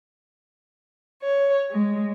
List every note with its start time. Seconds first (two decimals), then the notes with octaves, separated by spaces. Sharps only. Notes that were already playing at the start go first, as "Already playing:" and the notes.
1.23 C#5
1.71 G#3